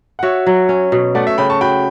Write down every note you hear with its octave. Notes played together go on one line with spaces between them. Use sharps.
F#5
F#4 C#5 E5
F#3
C#4
B2
A3 D5 F#5
C#5 E5
C#3 G5 B5
A5 C#6
F#4 G5 B5